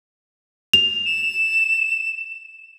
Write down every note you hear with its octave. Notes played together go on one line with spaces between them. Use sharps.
F7
E7